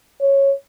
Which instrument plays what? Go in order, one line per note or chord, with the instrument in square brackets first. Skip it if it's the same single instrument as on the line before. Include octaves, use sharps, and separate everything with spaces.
[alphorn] C#5